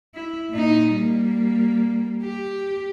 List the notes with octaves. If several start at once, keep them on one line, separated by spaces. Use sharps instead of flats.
E4
A#2 D#4
G3 A#3
G4